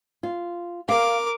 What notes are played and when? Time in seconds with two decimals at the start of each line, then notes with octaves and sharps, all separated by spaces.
0.23 F4
0.89 A#4 F5 D6